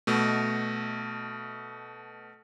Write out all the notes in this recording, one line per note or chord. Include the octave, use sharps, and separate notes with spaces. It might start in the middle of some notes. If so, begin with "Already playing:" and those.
B2 A3